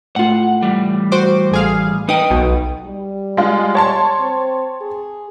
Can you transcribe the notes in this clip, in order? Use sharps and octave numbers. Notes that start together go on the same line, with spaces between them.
A2 F4 F#5
E3 G3
F#4 C5 D6
A1 G#4 F5
D#4 B4 D#5 G5 D#6
B1 B2
G3
G#3 F4
C#5 A5 C6
C4
G#4